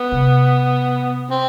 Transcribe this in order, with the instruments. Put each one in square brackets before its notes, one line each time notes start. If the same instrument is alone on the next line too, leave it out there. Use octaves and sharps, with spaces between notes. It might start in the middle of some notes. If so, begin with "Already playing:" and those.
Already playing: [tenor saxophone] B3
[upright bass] C3
[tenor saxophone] C4